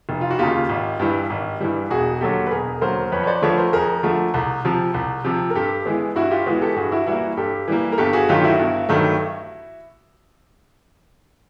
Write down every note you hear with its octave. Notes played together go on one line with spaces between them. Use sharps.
F1
F4
F#4
D#2 C#3 F4 G4
G#1
G2 E3 G3
G#1
G2 E3 G3
E1 F#4 G#4
D#2 D3 F#3 G4 A4
B4
E1 G#4 A#4
D#2 D3 F#3 A#4 C5
F2 B4 C#5
C#5
C5 D5
D3 F3 A3 B4 C#5
A#4 C5
F2 G#4 A#4
D3 F3 A3
C2
C3 F3
C2
C3 F3
A#4
G2 G4 A4
E3 G#3 B3
G2 E4 F#4
F4 G4
E3 G#3 B3 F#4 G#4
G4 A4
G2 F#4 G#4
E4 F#4
E3 G3 A#3 E4 F#4
G2 G4 A4
E3 G3 A#3
A#4
G1 G4 A4
F#4 G#4
G2 D#3 F#3 A3 F4 G4
E4 F#4
G1
G2 D#3 F#3 A3